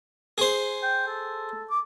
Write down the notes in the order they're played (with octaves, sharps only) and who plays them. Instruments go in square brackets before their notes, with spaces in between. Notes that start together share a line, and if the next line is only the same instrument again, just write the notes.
[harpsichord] G#4 C5
[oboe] G5
A4
D6